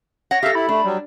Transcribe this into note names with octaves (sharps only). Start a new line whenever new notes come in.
C#5 F#5 A#6
G4 A4 E5 F5
E4 B5
A3 D4
F#3 G3